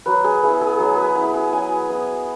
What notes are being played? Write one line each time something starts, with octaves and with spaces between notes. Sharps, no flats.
F#3 B4
G#4
B3 E4 G#4
G#4
F#3 G#4
B4
B3 E4 B4
G#4
F#3 G#5
B3 E4